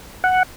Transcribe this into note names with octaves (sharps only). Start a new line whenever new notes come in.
F#5